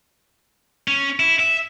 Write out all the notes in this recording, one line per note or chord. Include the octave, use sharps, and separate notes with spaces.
C#4
E4
E5